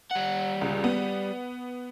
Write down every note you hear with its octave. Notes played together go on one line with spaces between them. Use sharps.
G3 F#5
C#2
B3